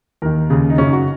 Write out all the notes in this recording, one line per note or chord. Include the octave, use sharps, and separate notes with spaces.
D#2 D#3 A#4
D#2 C#3 G#4
D#4
F#2 C#3 C#4
D#4
F#4